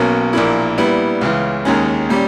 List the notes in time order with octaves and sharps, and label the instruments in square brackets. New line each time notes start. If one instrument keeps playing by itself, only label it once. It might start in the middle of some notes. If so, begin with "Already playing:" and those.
Already playing: [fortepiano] B1 B2 A#3 C#4
A#1 A#2 A#3 E4
A#2 G3 B3 E4
C#2 C#3 E3
D#2 D#3 G#3 C#4
A#2 G3 C#4